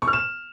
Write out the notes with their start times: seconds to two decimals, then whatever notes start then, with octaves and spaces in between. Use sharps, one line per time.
0.02 C#6
0.08 F6
0.13 E7